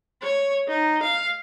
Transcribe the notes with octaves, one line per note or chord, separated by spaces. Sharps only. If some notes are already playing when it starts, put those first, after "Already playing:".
C#5
D#4
F5